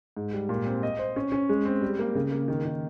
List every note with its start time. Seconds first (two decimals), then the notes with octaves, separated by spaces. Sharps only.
0.17 G#2
0.33 G3
0.49 A#2
0.66 C4
0.83 D#5
0.99 C5
1.16 C#4
1.32 C#4
1.49 G#3
1.65 C4
1.82 G3
1.99 A#3
2.15 C#3
2.32 A#3
2.48 D#3
2.65 D#3